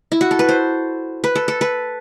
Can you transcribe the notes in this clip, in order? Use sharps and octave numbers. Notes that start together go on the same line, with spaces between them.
E4
F#4
A4
B4
C5
B4
A4
A4
B4